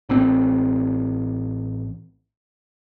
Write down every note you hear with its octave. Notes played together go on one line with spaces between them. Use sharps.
A1 C4